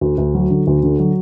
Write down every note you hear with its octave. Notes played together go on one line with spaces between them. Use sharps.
D2
D2
F#3
D3
D2
D3
F#3